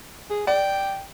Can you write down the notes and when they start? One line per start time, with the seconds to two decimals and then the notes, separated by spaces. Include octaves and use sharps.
0.30 G#4
0.47 D5 G5